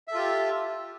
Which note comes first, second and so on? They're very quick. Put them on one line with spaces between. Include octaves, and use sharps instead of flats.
E5 A4 F4 G4